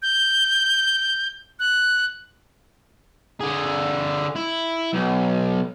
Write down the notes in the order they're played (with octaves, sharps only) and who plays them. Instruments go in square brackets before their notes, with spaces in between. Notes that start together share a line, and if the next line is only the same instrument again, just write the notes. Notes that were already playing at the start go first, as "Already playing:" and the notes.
[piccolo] G6
F#6
[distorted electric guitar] D3 G#4
E4
B1